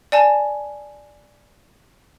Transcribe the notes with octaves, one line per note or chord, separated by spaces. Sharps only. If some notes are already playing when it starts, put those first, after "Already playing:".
D5 G#5 A5